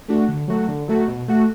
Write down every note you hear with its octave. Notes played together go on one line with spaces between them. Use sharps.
A3 D4 F#4
D3
F#3 A3 F#4
D3
F#3 A3 F#4
B2
A3 F#4